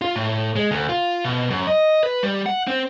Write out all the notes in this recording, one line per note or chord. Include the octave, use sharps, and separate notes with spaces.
F4
A2
G#3
D2
F4
B2
F#2
D#5
B4
G3
F#5
C4